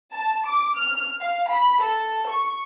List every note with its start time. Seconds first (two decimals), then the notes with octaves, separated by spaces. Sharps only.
0.13 A5
0.47 D6
0.78 F6
1.20 F5
1.50 B5
1.83 A4
2.29 C#6